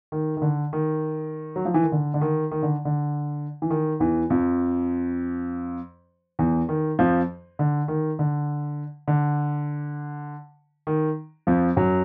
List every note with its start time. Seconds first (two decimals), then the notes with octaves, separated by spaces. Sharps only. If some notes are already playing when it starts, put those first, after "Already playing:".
0.12 D#3
0.37 D#3
0.42 D3
0.73 D#3
1.56 F#3
1.65 F3
1.74 E3
1.83 D#3
1.92 D3
2.14 D3
2.21 D#3
2.51 D#3
2.63 D3
2.85 D3
3.62 E3
3.70 D#3
4.00 E2 E3
4.30 F2 F3
6.39 E2 E3
6.69 D#3
6.99 F2 F3
7.59 D3
7.88 D#3
8.19 D3
9.08 D3
10.87 D#3
11.47 F2 F3
11.77 F#2 F#3